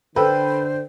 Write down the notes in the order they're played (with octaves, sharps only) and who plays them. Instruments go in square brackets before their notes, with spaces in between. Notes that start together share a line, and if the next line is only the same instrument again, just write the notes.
[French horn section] D3 [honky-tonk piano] A4 B4 [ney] C5 [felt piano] G5 E6